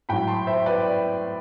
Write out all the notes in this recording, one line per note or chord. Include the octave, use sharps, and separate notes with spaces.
A2 F#3 G5 B5
A5 C6
C5 E5
B4 D5